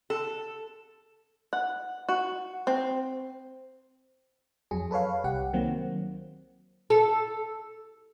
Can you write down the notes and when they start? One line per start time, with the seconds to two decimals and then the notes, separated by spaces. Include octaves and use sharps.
0.10 A4
1.53 F#5
2.09 F#4
2.67 C4
4.71 F2 F#3 G#4
4.91 A4 B4 C#5 F5
5.24 C2 G4 F#5
5.53 D#3 F#3 A#3 C4
6.90 A4